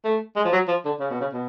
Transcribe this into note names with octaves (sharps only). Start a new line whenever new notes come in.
A3
G#3
F3
F#3
F3
D3
C#3
B2
C#3
B2